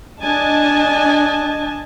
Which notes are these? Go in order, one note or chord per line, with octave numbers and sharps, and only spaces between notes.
D4 D#5 G#5 A5